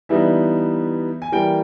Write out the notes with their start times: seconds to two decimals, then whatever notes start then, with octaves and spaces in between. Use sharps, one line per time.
0.09 E3 G3 B3 D#4 E5
1.22 G#5
1.32 E3 G3 A#3 G5